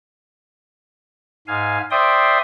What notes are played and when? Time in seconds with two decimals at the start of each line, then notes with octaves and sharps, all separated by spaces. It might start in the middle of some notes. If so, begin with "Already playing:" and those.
1.47 G#2 F5 G#5
1.91 C5 D5 E5 G5 C6 D#6